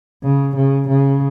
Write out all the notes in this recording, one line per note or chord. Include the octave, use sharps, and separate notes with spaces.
C#3
C#3
C#3